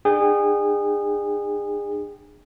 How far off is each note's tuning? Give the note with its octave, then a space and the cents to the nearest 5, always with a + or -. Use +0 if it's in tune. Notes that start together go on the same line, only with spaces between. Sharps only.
D4 +40 G#4 -30 G5 -30